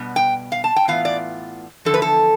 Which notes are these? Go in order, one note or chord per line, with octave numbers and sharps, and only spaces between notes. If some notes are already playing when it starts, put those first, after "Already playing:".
Already playing: B2 G3 B3
G5
F5
A5
G5
A2 E3 B3 F4 F5
D5
E2 D3 F3 A4
B4
A4